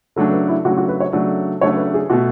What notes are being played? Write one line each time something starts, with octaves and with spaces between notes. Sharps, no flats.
C#3 F#3 A3 D4 A4
B4
E4
C#3 F#3 A3 D4 F#4
F#4
B4
C#5
C#3 F#3 A3 D4 D5
C#3 F#3 A3 D4 C#5
B4
G#4
B2 A3 F#4